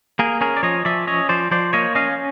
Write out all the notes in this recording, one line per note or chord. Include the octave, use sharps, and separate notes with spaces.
A#3 G#4 A#4
C#4 G#4 A#4
D5
F3 C#5 D#5
F3 D5 E5
C#4 C#5 D#5
F3 C5 D5
F3 C5 D5
A#3 C#5 D#5
C#4 D#5 F5